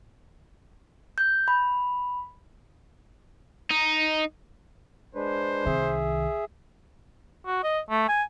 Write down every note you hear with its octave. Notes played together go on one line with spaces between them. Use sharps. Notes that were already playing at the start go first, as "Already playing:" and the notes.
G6
B5
D#4
G#3 D4 B4 C5
C2 D#3 G#4 E5
F#4
D#5
A3
G#5